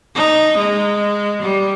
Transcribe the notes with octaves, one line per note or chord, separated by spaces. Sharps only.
D#4
G#3
G3